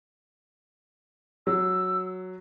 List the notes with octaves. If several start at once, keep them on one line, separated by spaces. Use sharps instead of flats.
F#3 E6